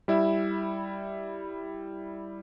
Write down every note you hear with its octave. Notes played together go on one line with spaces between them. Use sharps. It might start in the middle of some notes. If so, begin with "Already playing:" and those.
G3 E4 E5